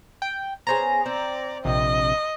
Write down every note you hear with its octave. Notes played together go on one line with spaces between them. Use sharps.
G5
B3 C#4 G#4 C5 A#5
C4 D5
A#1 C3 D#5